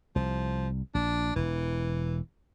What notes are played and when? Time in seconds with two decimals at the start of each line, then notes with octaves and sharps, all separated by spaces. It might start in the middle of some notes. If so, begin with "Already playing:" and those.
0.16 C2 F3
0.95 A#1 D4
1.36 E1 E3